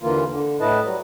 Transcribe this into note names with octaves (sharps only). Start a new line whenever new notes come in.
D#2 D3 E3 A#3 F4
D3
A2 E4 B4 D#5 A5
F#3 G3